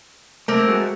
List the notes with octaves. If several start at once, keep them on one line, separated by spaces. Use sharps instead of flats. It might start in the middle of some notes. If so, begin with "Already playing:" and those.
A3 A#3 C4 A#4
G#3 A3 F#4